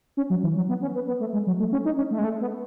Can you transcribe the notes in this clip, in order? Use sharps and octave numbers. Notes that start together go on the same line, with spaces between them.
C#4
F#3
E3
F#3
B3
C#4
B3
B3
A3
G#3
F#3
A3
C#4
D#4
C#4
A3
G#3
A3
B3